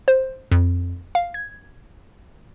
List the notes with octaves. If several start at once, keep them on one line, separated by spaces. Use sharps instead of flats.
C5
F2
F5
G#6